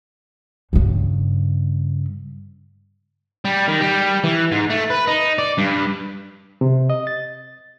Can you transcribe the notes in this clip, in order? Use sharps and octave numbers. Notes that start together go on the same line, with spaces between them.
G2 C#3
G3
D#3
G3
E3
G#2
A3
B4
D#4
D5
G2
C3
D#5
A6